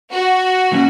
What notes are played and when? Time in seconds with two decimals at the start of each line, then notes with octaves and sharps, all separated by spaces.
0.13 F#4
0.72 A#2 F#3 A#3 C#4